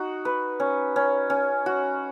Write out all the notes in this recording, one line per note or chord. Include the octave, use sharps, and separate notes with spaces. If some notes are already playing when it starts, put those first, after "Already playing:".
Already playing: D#4 F#4
B4
C#4
C#4
C#4
F#4